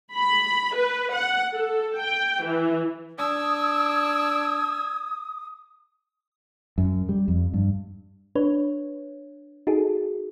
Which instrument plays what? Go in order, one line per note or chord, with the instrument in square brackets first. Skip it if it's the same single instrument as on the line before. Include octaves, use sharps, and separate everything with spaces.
[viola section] B5
B4
F#5
A4
G5
E3
[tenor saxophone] D4 [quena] D#6 [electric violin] E6 G#6
[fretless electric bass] F#2
G3
F2
G2
[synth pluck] D4 B4 C#5
D#4 F#4 G#4 A4